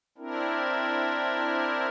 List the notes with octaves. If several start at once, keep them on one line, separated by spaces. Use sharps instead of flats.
C4 D4 E4 A#4